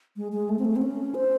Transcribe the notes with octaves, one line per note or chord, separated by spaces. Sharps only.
G#3
G#3
A3
C4
A3
C4
C#4
C5